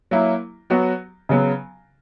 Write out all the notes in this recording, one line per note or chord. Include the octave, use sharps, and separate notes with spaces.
F#3 A#3 E4
F#3 B3 F#4
C#3 F#3 B3